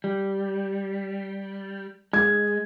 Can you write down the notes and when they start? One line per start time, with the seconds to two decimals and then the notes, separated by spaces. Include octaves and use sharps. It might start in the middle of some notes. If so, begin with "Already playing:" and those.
0.04 G3
2.13 G#3 G#6